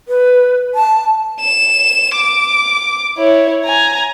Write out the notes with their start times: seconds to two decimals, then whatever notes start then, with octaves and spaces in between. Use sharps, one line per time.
0.08 B4
0.75 A5
1.40 E7
2.15 D6
3.18 E4 C#5
3.65 G#5 A#5